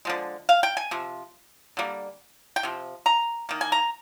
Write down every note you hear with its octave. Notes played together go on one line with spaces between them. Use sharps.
D3 F3 G#3
F5
G5
G#5
C3 F3
D3 G3 A#3
G5
C3 F3
A#5
D#3 A#3
G#5
A#5